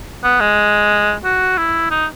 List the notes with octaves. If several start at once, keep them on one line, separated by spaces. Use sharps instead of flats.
B3
G#3
F#4
E4
D#4